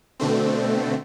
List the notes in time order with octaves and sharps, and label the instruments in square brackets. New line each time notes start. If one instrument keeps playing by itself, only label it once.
[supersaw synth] B2 D3 A3 C4